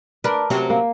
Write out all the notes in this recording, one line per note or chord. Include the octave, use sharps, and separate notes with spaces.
D4 A#4 B4
C3 F#3 C4 C#4
A#3